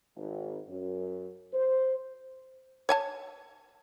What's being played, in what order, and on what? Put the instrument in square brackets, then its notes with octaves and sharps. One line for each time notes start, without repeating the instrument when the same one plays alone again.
[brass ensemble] G#1
F#2
C5
[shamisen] C#5 G#5 A5